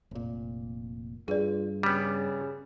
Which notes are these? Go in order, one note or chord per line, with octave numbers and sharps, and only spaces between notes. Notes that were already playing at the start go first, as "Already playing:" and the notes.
F1 A#2
G2 F4 G#4 B4 D5
C#3 G3 B3 F6 B6